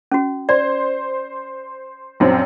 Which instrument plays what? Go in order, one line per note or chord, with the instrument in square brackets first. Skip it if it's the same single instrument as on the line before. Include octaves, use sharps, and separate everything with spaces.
[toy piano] C#4 F#4
[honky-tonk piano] C5 [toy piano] D5
[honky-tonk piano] A#1 F#2 C4